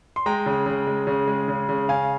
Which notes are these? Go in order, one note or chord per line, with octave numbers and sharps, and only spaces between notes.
C6
G#3 G5 A#5
C#3
C#3
G#3
C#3
G#3
C#3
C#3
C#3 F5 G#5